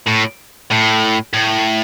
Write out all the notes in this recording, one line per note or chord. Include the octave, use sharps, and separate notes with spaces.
A2
A2
A2